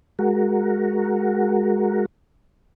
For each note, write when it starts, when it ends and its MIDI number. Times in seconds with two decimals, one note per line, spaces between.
0.19 2.06 56
0.19 2.06 66
0.19 2.06 70